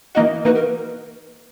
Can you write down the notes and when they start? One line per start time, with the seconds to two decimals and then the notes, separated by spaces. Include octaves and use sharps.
0.14 E3 A#3 D#4 F#4 D#5
0.44 E3 A#3 D#4 F#4 B4
0.55 A#4